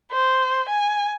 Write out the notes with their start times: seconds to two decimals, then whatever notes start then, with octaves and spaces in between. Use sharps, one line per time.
0.12 C5
0.69 G#5